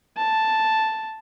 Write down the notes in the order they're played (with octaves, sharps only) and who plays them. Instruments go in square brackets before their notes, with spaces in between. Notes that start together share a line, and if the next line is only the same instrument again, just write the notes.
[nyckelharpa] A5